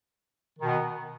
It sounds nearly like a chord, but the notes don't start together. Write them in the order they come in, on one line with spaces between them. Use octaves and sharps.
D#3 B2 B3